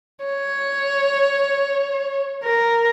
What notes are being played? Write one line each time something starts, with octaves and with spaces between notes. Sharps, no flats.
C#5
A#4